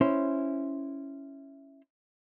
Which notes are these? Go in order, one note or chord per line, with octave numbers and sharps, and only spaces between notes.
C#4 E4 C5